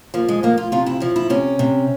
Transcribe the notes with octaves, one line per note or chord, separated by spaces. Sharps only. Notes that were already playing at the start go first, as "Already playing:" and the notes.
F3 A#3
G#3
F3 A#3
F4
C3 F4
E4
F3 E4
E4
C3 C#4
C3